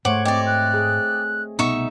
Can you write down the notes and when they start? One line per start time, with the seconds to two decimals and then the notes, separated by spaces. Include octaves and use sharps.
0.05 G#2 A3 C5 C#5 F#5 D6
0.25 C4 G4 D5 D#5 D6
0.47 F#6
0.74 G#4
1.59 C2 B2 D#4 E5 C#6